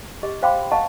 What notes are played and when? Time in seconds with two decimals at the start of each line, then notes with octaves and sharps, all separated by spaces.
0.23 G4 G#4 D#5
0.42 C5 F5 G5 B5 C6 D6
0.72 D#5 F5 F#5 A5 A#5 C#6